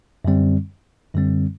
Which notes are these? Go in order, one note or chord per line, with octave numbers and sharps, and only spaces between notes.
F#2 D3 G3 C4
F#2 D3 G3 C4